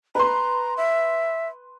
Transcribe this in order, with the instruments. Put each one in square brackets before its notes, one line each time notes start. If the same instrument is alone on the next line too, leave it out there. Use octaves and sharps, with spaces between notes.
[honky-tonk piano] B4 C6 [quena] A#5
[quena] E5